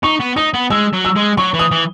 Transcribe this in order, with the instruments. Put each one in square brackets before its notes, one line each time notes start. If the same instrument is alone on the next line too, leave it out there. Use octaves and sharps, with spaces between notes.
[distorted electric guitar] D#4 [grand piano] C#6
[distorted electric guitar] B3
[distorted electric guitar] D#4 [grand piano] D#6
[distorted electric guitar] B3
[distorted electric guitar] G#3 [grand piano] E6
[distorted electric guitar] F#3
[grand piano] E6
[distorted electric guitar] G#3
[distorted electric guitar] F#3 [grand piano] C#6
[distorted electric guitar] E3
[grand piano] D#6
[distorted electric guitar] E3